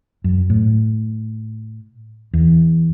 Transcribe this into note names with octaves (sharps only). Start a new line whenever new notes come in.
F#2
A2
E2